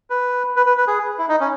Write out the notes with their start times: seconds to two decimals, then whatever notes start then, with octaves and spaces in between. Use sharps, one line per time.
0.10 B4
0.56 B4
0.66 B4
0.77 B4
0.87 G#4
1.18 E4
1.29 D#4
1.40 C#4